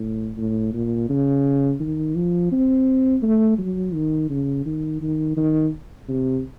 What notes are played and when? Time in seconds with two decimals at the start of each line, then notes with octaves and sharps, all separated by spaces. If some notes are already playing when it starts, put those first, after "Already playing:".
Already playing: A2
0.38 A2
0.73 A#2
1.09 C#3
1.80 D#3
2.15 F3
2.52 C4
3.22 A3
3.59 F#3
3.94 D#3
4.30 C#3
4.66 D#3
5.02 D#3
5.37 D#3
6.09 C3